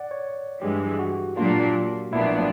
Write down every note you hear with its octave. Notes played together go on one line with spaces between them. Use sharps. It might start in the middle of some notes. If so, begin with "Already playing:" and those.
Already playing: D5 F#5
C#5
G2 E3 G#3 G4
F#4
A#2 F#3 A#3 D4 F4
A#1 A#2 F#3 B3 D4 E4